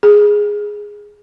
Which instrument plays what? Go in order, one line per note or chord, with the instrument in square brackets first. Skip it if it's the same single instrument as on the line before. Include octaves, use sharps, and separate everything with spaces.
[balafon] G#4